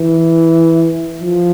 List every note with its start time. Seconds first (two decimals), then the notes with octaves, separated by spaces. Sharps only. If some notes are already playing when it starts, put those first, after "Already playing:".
Already playing: E3
1.21 F3